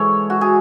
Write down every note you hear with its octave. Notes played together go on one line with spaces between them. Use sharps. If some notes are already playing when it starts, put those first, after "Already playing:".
Already playing: G#2 E3 G#3 A4 C#5
F#4
G#4